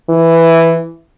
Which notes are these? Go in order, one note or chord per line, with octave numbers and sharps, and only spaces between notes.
E3